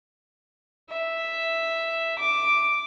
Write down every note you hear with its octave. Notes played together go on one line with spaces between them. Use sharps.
E5
D6